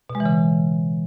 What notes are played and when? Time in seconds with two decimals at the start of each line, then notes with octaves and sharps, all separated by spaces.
0.10 B2
0.15 G#3
0.20 E3
0.26 C#3